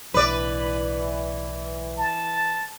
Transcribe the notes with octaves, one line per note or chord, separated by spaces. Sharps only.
B1 A2 E3 B4 D5
A5